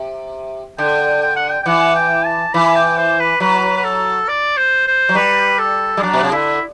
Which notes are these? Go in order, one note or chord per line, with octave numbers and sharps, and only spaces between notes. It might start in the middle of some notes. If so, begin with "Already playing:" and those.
Already playing: C3
D3 G5
G5
F#5
G5
G5
E3 F#5
G5
A5
E3 B5
G5
C5
B4
F#3 B4
B4
A4
D5
C5
C5
F#3
G3 B4
A4
G3
F#3 D4
B2
C3
D3 E4